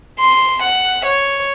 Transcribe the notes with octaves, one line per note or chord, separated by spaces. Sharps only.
C6
F#5
C#5